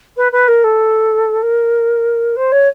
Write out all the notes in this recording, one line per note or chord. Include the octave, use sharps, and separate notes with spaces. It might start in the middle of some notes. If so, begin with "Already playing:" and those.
B4
B4
A#4
A4
A#4
C5
C#5